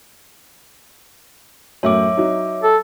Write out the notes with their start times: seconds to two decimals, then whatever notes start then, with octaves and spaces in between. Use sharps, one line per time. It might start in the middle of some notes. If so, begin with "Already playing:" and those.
1.83 F#2 A2 C#5 E5 D6
2.17 F#3 D#4
2.63 A4